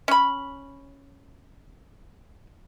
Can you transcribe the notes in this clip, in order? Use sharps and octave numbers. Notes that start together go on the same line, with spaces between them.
C#4 B5